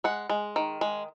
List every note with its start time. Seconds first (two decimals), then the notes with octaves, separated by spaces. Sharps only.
0.04 G#3 F#5
0.29 G#3
0.56 D#3
0.81 G#3